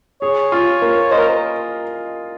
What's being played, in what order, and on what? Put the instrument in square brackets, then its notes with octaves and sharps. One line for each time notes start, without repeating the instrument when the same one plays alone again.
[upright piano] G#4 [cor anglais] C#5
[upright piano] F4
A#3
[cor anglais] C5 [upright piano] D#5
[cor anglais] A#4